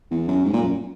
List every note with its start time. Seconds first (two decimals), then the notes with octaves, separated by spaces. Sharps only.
0.11 E2
0.28 F#2
0.45 G#2
0.53 A#2
0.62 F#2